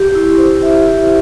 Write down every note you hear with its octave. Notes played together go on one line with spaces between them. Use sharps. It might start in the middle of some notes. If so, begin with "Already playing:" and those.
Already playing: G4
E4
C5
E5
G4